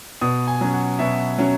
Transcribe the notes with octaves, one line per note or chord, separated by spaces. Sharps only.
B2 D#6
G#5
F#3 C#4
F#5
B2 E5
F#3 C#4